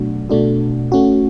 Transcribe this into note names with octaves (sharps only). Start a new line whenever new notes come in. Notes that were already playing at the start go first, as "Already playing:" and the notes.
Already playing: B2 F#3 A3 D4 F#4
B2 A3 D4 F#4
A3 C#4 F#4